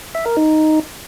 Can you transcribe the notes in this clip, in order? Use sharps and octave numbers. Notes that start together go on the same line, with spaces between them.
E5
A#4
D#4